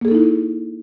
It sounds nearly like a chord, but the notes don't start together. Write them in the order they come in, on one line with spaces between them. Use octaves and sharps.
A#3 G#4 A4 D#4 E4